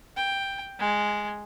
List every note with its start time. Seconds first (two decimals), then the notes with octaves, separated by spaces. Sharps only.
0.17 G5
0.80 G#3